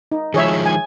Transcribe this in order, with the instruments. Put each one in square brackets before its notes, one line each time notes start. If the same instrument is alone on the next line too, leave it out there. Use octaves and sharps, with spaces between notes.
[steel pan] D#4
[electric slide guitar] D#3 F3 G#3 [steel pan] G#4 C#5 E5
[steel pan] G#5